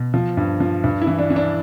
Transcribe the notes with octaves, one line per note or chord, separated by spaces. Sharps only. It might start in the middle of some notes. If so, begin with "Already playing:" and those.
Already playing: B2
F3
G2
F3
G2
E4
E3
D4
E3
D4